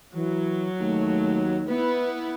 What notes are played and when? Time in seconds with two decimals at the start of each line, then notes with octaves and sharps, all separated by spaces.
0.13 E3 F#3
0.81 D#2 A3
1.67 B3 E4 B4